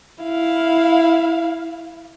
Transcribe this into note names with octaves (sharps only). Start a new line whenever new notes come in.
E4 F5